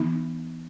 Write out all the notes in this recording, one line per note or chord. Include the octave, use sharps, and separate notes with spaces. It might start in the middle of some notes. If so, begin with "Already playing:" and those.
Already playing: E3 B3 D#4